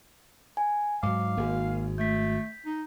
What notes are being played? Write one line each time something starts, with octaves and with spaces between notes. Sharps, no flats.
G#5
G#2 F#3 F5 D6
G#1 A#3 G#4
A3 G6 B6
D#4